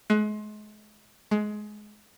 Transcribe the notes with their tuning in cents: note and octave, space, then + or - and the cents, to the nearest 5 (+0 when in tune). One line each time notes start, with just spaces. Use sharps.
G#3 +35
G#3 +20